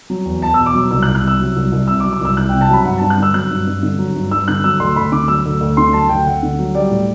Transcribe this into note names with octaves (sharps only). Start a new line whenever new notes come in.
F#3
E2
E2 A5
B2 E6
D6
F#3
C2 E6
F#6
C2
F#6
C3 E6
F#3
C2
C2
C3 E6
D6
F#3
D6
C2 E6
C2 F#6
C3 G5
A5
F#3 B5
G2 F#5
G2 A5
F#6
D3 E6
F#3 F#6
G2
G2
D3
F#3
G2
G2 E6
D3 F#6
F#3 E6
D2 C6
D2 B5
D3 D6
F#3 E6
D2
D2
D3 C6
F#3 A5
D2 G5
D2 F#5
D3
F#3
G3 D5
A2